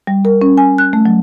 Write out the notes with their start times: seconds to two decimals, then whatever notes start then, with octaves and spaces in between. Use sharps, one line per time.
0.07 G3
0.25 A#4
0.42 C#4
0.57 G#5
0.78 F#6
0.93 A3
1.06 F#3